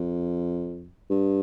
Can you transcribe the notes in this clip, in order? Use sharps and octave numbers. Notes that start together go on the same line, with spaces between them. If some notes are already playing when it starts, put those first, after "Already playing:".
Already playing: F2
G2